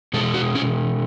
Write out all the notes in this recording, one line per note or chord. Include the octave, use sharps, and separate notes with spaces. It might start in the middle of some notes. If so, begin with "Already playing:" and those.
B2 G#3 A4
F#4
C#4